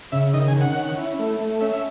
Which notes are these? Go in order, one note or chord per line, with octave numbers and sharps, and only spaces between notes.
C#3 E5
D#3 D#5
G#5
D#3
F#5
C#4
E4
A3
A3
C#4 E5
E5